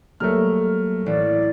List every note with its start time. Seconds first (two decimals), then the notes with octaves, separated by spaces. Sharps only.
0.20 F#3 G3 A3 A#3 A#4 F6
1.06 A1 D5